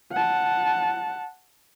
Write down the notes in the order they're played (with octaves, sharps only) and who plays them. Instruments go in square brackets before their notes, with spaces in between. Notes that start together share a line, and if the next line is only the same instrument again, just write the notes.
[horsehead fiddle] F#5 A5